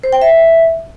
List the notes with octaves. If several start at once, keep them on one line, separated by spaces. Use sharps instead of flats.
C5
G5
E5